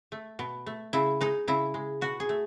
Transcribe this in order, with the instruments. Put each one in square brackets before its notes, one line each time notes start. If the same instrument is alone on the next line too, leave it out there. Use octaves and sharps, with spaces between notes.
[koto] A3
B2
A3
C#3 E4
G#3 D#4
C#3 E4
G#3
B2 F#4
G#4
A3